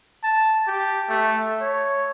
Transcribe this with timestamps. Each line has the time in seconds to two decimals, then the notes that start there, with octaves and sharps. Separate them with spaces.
0.24 A5
0.67 G4
1.09 A3
1.61 C#5